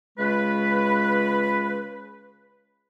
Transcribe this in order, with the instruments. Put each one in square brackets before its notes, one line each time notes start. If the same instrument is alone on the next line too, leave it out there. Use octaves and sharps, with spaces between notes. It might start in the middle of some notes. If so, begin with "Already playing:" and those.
[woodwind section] C#3 G#3 F4 B4